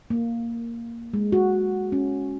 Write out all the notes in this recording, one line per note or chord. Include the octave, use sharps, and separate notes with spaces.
A#3
G#3
F#4
C#4